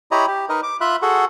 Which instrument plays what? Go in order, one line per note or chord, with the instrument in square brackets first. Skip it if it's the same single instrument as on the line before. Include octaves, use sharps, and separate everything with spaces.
[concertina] E4 G4 C#5 D#5 A#5 B5
G4
D#4 A#4 B4 D#5
D6
F4 E5 B5 F#6
F#4 G#4 A4 F#5